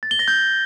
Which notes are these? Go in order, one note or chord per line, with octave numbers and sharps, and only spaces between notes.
A6
G7
A#6
G6